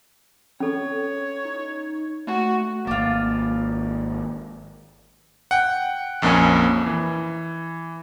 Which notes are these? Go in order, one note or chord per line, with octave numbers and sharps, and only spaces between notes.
C#4 A4 C#5
D#4
A3 F#4
G#1 A#3 D4 F4
F#5 G5
A#1 F2 A#3 C#4 G#5
E3